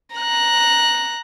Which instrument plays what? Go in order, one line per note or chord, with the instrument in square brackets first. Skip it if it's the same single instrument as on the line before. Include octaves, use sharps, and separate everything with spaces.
[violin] A#5 F#6